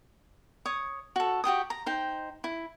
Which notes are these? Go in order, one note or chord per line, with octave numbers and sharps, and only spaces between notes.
C#5 D#6
F#4 A4
F#4 G4 G5 D#6
A#5
D#4 C5 G5
E4